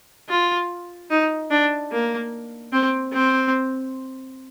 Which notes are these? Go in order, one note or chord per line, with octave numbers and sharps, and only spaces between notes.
F4
D#4
D4
A#3
C4
C4